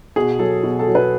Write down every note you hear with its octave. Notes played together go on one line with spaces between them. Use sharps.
B2 G#4
F#3 A4
B2
A4
F#3
B4